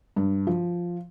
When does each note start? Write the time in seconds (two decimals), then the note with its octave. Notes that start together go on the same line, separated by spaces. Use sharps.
0.16 G2
0.47 F3